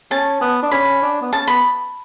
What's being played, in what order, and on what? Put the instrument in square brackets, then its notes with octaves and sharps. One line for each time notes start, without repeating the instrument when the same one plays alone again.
[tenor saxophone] C#4 [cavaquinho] A5
[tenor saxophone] B3
D4
[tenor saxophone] C#4 [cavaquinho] B5
[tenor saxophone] D4
B3
[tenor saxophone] C#4 [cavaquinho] A5
[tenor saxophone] B3 [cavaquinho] B5